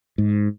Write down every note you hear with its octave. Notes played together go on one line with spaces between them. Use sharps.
G#2